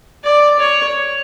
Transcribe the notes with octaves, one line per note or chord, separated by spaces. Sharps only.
D5
C#5